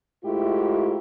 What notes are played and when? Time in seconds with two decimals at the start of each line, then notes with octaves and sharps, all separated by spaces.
0.24 G#2 A3 E4 F4 G4